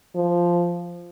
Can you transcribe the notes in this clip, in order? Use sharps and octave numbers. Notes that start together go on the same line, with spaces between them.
F3